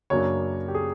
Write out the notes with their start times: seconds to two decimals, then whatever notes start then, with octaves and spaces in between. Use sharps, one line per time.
0.10 F#2 C#3 F#3 A#3 D4 C#5
0.68 G4
0.75 G#4